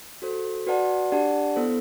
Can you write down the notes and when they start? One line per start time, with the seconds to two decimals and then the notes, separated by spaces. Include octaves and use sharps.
0.22 F#4 A4 C5
0.66 F#4 B4 D5 F#5 A5
1.12 D4 G4 D5 F#5 A5
1.56 B3 E4 A4 C5